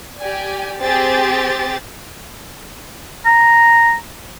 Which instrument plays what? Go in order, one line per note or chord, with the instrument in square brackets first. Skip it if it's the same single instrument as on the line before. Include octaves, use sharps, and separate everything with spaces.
[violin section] G4 D5 G#5
C4 G4 G#4 A6
[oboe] A#5